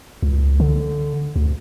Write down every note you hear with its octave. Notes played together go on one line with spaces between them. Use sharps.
C#2
D3
D2